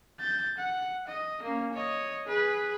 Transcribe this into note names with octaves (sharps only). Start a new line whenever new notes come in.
G6 A6
F#5
D#5
A#3 C#4
C#5 D#5
G#4 B4